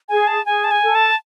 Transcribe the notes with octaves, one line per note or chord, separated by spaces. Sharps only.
G#4 G#5
A5
G#4 G#5
A5
G#5
A4
A5